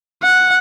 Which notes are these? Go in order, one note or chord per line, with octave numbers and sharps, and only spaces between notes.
F#5